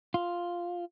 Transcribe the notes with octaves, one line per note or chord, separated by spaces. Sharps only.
F4